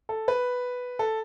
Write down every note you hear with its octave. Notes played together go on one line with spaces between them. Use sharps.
A4
B4
A4